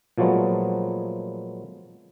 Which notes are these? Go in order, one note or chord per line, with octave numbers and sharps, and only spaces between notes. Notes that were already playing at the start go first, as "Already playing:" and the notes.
A#2 F3 F#3 G#3 A3 B3